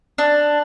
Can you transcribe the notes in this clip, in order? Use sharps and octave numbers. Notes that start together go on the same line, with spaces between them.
D4